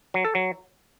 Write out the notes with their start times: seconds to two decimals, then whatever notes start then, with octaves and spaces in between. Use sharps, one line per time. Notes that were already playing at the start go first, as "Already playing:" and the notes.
0.14 F#3
0.25 A4
0.35 F#3